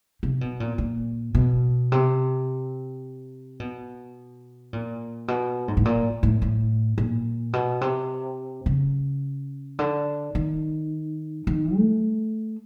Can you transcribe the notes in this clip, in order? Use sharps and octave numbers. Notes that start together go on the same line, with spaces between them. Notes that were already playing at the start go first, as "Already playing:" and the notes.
C3
B2
A#2
A#2
B2
C3
B2
A#2
B2
G#2
A2
A#2
A2
A2
A#2
B2
C3
C#3
D3
D#3
D#3
A3